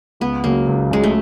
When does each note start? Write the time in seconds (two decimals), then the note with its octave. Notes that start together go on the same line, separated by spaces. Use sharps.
0.20 C#2 B3
0.44 C#3 F#3 A#3
0.67 C#2
0.91 C#3 F#3 G#3
1.04 A3